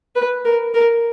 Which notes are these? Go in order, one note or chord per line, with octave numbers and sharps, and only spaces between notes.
B4
A#4
A#4